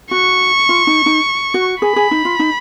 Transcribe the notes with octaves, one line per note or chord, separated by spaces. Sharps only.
F#4 C#6
F4
D#4
D#4
F#4
G#4 B5
G#4
D#4
F4
D#4